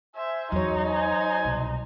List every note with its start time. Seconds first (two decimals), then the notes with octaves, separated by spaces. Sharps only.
0.16 C5 E5 G#5
0.52 E2 F#3 D#4 C#5
0.88 C5 G#5
1.44 C2 B2